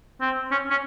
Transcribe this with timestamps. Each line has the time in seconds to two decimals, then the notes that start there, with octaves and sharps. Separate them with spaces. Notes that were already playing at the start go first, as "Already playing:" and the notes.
0.21 C4
0.51 C#4
0.70 C#4